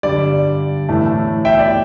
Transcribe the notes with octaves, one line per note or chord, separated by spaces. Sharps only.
G2 D3 G3 D5
A2 E3 A3
E5 G5
D5